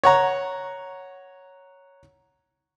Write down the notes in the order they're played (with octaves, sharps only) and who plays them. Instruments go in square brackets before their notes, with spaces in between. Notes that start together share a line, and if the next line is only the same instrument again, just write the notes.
[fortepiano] C#5 F#5 A#5